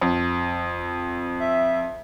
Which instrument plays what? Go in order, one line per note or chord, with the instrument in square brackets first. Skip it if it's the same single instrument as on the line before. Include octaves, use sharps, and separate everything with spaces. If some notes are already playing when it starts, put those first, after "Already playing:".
[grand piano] F2
[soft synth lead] E5